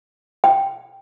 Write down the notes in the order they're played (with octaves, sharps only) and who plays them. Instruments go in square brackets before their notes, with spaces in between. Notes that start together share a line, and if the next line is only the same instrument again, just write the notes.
[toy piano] G5